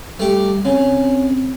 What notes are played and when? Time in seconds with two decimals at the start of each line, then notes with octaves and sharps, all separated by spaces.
0.20 G3 A3 G4
0.65 C#3 C4